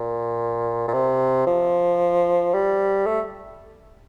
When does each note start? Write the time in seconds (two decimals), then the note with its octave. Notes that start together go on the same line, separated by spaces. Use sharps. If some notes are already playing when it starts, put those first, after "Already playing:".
Already playing: A#2
0.88 A#2
0.94 C3
1.47 F3
2.54 G3
3.06 A3